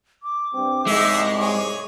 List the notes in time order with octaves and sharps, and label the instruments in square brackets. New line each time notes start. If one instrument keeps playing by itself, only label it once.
[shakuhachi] D6
[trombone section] G2 C4
[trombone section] C2 G#2 [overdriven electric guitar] G#3 [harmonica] D#4 E5
[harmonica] G#4 C#5